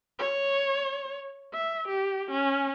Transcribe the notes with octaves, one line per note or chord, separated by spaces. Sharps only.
C#5
E5
G4
C#4